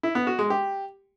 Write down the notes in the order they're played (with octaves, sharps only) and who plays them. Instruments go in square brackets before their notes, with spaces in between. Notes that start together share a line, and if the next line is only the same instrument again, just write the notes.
[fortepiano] E4
B3
F#4
G#3
G4